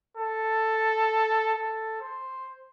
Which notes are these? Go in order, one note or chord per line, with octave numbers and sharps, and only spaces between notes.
A4
A4
C5